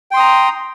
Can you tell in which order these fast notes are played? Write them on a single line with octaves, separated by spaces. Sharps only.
G5 C6 D#6 A#5